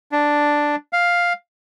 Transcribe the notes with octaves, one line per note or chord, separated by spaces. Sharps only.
D4
F5